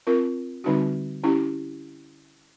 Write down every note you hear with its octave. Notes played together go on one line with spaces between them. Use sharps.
C4 F4 A#4
D3 G3 C4 D#4 F#4
C#4 E4 G4